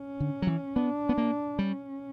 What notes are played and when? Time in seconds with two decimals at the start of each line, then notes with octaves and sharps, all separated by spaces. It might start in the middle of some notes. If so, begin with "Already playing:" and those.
Already playing: C#4
0.20 D3
0.42 F#3
0.47 E3
0.76 B3 D4
1.09 B3
1.18 A#3
1.59 G3 C#4